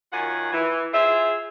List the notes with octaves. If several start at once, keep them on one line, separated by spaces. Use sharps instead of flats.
F#2 D#3 F4 F#5 G#5
E3
F4 G#4 C5 E5